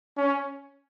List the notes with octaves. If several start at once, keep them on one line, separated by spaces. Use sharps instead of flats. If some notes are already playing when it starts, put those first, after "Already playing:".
C#4